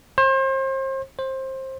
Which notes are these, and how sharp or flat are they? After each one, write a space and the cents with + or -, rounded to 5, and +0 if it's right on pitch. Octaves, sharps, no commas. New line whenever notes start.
C5 +35
C5 +20